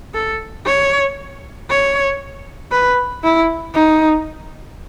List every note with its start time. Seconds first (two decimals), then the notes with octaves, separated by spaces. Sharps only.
0.14 A4
0.66 C#5
1.70 C#5
2.72 B4
3.23 E4
3.75 D#4